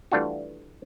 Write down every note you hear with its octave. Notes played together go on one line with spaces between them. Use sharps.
E3 G3 A3 D4 F4 F#4